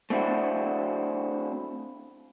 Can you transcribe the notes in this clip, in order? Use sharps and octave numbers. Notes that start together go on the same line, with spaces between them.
A3 C4 D4 E4 F#4